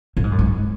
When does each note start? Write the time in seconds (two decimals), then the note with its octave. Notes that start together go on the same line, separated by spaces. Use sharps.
0.17 A2
0.24 G#2
0.32 F#2
0.39 G#2